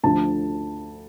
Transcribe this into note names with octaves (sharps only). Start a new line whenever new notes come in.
D2 D3 F3 A5